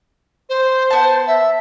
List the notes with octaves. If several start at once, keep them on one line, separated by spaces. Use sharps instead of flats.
C5
B3 A5
E5